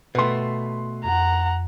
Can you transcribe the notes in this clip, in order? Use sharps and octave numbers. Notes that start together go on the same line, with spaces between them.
B2 A3 B4 C6
F2 F#5 A#5